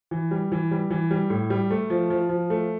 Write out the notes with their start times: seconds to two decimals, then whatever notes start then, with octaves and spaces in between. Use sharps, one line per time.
0.11 E3
0.31 G3
0.52 E3
0.71 G3
0.90 E3
1.11 G3
1.30 A2
1.50 G3
1.71 A3
1.90 F3
2.10 F3
2.29 F3
2.50 A3